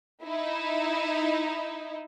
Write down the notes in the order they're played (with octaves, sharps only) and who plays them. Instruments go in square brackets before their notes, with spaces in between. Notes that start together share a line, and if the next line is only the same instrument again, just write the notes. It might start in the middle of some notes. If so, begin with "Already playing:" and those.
[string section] D#4 E4